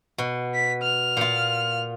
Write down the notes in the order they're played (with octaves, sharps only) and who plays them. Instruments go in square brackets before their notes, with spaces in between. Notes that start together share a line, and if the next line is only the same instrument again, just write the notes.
[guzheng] B2
[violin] B6
F6
[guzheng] A#2 F4